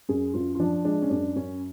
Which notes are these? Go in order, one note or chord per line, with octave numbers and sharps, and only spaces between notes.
F#2 G#4
F#2 F4
F4
F3 D4
G#3 D4
C#4
F#2 D4
F#2 C#4